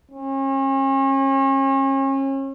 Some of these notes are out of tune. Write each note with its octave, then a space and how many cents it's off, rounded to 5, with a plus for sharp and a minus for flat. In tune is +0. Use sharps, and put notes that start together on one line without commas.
C#4 -40